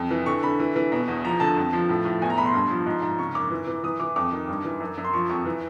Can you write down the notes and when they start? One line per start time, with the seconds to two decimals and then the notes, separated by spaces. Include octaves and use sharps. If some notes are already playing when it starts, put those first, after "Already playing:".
Already playing: F2
0.11 E3
0.26 D3 C#6
0.43 D3 B5
0.59 E3
0.76 E3
0.92 B2
1.08 E2
1.24 F3 A#5
1.40 D3 A5
1.56 F2
1.73 F3
1.89 A2
2.05 A2
2.21 E2 G#5
2.30 A#5
2.38 B2 B5
2.46 C6
2.54 G2
2.70 F3
2.86 G#2
3.02 G#2
3.19 C#3 C#6
3.35 F#2 D6
3.50 E3
3.67 E3
3.83 E3 D#6
4.00 E3 D6
4.16 F2 D6
4.32 D#3
4.48 G2
4.65 E3
4.80 F#2
4.97 F#2
5.04 C6
5.13 F3 C#6
5.29 F2 C#6
5.45 E3